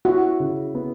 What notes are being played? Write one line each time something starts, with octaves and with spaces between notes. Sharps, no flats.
E4 F#4
C#3
B3